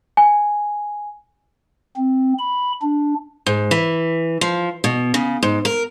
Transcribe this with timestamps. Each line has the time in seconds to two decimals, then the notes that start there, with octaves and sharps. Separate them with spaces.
0.17 G#5
1.97 C4
2.39 B5
2.82 D4
3.46 G#2
3.71 E3
4.41 F3
4.84 B2
5.14 C#3
5.43 G#2
5.65 A#4